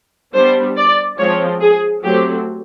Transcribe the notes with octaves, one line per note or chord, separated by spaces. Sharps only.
G3 B3 D4 C5
D5
F3 G#3 C4 C#5
G#4
F#3 A3 C4 G4